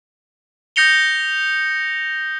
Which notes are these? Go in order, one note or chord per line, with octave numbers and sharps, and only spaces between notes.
D#6 G6 A#6 C#7 F7 G7